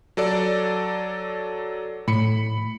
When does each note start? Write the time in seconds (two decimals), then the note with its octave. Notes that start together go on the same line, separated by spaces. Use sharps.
0.17 F#3 A4 D5
2.08 A2 B5 C#7